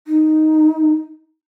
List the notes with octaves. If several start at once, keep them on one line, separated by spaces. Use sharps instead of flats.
D#4